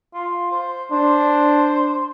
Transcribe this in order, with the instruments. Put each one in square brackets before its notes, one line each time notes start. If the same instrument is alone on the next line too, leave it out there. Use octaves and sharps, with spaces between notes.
[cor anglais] F4
C5
[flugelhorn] D4 [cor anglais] C5